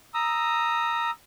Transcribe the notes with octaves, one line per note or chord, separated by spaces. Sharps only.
A#5 D#6 E6